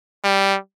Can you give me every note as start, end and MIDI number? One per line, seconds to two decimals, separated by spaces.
0.24 0.57 55